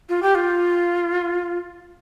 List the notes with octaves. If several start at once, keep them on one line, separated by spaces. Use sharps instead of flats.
F4
G4
F4